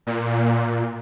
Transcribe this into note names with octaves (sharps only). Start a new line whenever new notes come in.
A#2